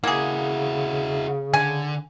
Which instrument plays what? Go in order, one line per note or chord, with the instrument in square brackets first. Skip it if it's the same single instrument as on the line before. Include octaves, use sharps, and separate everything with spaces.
[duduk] C#3 [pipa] A#3 G#4 [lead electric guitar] E4 F#4
[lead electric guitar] D3 [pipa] G#5